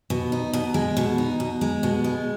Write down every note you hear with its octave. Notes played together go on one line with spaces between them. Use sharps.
B2
D#4
B2
G#3
B2
D#4
B2
G#3
B2
G#3